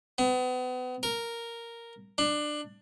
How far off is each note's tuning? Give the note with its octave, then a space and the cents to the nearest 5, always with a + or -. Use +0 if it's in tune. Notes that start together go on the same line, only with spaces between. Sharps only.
B3 +35
A#4 -5
D4 +20